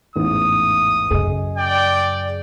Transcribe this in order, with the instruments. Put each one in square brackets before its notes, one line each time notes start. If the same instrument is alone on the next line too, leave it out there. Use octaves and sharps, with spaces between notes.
[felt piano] A1 E2 G#2 [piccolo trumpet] D#6
[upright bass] F#2 C#3 [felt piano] G#4 D#5
[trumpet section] D5 [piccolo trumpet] G5